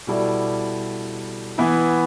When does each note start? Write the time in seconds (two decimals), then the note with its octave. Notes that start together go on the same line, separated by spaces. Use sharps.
0.07 B2 G3 E4 A4 D5
1.58 E3 B3 E4